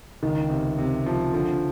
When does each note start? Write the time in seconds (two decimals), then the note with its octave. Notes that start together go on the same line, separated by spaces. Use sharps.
0.23 C#2 D#3
0.50 C3
0.78 C3
1.06 F3
1.33 D3 F3